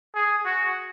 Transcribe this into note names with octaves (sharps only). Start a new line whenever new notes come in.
G#4
F#4